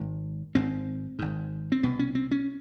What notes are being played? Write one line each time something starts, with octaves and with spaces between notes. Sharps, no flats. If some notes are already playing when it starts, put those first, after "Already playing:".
Already playing: G#1 G#2
G#1 G#2 C4
G#1 G#2
C4
C2 B2 B3
C#4
C4
C#4